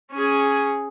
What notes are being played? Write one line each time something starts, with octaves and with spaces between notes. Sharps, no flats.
C#4 G#4